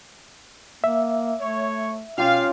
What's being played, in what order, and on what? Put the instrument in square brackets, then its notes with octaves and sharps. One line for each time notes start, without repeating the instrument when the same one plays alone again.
[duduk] A#3 [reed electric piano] E5
[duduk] A3 [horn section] C#5
[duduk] B2 [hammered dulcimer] C#4 F4 G4 [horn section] F5